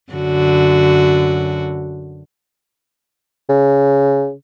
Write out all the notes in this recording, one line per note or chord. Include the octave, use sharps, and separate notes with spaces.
F#2 D3 F#4
C#3